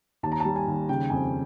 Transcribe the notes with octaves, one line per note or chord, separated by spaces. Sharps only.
D#2 A5
A#5
G3 A5
G#5
D#2
C#3 G5
F2 G#5